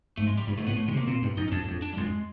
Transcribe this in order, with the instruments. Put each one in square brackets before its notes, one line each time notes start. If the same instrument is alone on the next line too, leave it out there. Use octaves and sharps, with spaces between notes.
[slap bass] G#2 [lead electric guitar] A3
[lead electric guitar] G#3
G3
[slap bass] G2
[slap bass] G#2 [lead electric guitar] A3
[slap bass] A2 [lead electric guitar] B3
[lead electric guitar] A3
[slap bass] C#3 [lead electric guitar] G#3
[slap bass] C3
[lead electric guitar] A#3
[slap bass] A#2 [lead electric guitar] C4
[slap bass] G2
[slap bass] F#2 [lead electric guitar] D#4
[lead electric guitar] C#4
[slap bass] F2 [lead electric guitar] D4
[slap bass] F2
[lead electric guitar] D4
G3
[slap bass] F2 [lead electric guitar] G#3